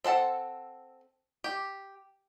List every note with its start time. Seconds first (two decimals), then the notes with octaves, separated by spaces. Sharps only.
0.04 C4 A4 F#5 A5
1.44 G4